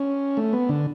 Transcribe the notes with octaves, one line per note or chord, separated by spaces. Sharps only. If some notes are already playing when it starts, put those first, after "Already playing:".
Already playing: C#4
A3
B3
D3